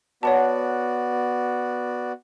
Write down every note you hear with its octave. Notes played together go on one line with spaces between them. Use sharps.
B3 F#4 C#5 D5 F#5 A5